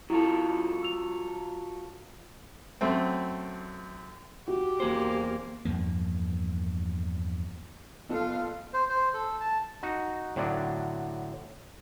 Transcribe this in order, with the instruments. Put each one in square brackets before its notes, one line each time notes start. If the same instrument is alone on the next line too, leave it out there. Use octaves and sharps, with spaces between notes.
[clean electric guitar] F#3 F4 A4 [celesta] E4
[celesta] E6 F7
[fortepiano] F#2 A3 C4
[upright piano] F#4 [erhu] G4
[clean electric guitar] E2 G#4 C5 [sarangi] A#3
[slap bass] E2 G2 F3 A#3
[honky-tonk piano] F#1 B3 A4 [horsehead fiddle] F4 F5
[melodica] C5
C5
A4
A5
[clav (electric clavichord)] D#4 F#4
A2 D3 F#3 D4